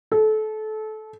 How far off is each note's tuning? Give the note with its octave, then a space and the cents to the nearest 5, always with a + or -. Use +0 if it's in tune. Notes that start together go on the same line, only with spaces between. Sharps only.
A4 -25